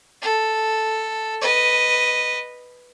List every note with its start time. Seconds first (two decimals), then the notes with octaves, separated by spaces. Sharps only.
0.22 A4
1.41 B4 D#5